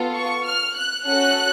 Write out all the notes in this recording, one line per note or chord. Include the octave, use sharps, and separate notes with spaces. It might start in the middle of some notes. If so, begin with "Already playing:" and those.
Already playing: B3 F4 A4
C#6
F6
F#6
C#4 F#4 A4 F#6